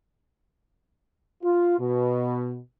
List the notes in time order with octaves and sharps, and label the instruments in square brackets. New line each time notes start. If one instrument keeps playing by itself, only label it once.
[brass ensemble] F4
B2